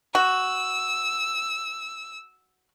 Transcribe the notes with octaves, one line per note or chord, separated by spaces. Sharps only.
F#4 E6